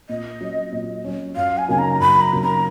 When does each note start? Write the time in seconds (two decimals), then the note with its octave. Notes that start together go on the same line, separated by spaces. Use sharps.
0.09 A#2 D#5
0.41 F#3 C#4
0.72 A#2
1.04 F#3 C#4
1.36 F#2 F5
1.58 G#5
1.68 C#3 F#3 A#3 D#4 G#5
1.79 A#5
2.00 F#2 B5
2.21 A#5
2.32 C#3 F#3 A#3 D#4
2.42 A#5